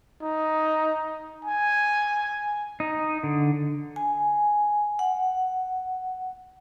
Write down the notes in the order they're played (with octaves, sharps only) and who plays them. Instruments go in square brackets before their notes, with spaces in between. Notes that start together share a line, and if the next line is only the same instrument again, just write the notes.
[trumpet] D#4
G#5
[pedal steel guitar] D#4
D3
[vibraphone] G#5
F#5